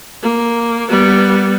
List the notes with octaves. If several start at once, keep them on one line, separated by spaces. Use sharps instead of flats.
A#3
G3 B3